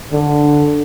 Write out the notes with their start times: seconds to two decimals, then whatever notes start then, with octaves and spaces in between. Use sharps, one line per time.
0.13 D3